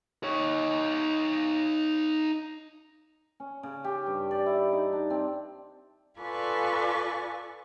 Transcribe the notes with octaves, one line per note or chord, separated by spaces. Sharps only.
D#4 C#5
C#4
C#3
G4
G2
D5
E4
D#4
D4
C4
F4 A4 B4 D5 G#5 C#6